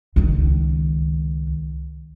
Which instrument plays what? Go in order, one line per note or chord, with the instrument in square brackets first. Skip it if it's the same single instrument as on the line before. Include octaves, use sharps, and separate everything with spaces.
[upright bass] C#2 D#3